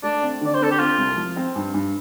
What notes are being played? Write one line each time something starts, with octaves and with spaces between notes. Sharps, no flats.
A3 D4
C4
D3 D5
C5
C4 A4
G4
C4 F4
C2
F3
C4
G2
G2